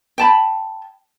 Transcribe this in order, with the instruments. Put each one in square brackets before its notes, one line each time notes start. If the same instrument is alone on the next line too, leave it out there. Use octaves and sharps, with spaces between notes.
[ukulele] G5 A5 B5